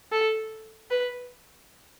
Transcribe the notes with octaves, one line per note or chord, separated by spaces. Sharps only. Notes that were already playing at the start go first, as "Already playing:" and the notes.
A4
B4